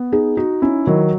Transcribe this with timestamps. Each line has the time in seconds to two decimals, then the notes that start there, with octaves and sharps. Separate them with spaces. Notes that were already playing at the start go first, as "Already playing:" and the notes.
Already playing: B3
0.12 D#4 G#4
0.37 D#4 F#4
0.62 C#4 E4
0.87 D#3 F#3